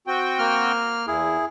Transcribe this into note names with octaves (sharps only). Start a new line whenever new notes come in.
C4 F#4 G5
A#3 F6
E2 E4 G#4